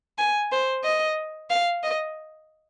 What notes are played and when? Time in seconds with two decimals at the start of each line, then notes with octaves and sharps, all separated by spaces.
0.18 G#5
0.52 C5
0.84 D#5
1.50 F5
1.83 D#5